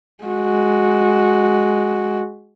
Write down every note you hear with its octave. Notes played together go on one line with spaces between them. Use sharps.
G#3 F#4